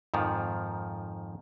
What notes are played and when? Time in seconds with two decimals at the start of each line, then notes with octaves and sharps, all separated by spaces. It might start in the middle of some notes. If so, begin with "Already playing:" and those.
0.14 F2 G#2 D#3 F3